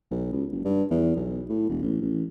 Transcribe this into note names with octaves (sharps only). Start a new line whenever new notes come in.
B1
C#2
F#1
G2
E2
B1
A2
E1
A1
A1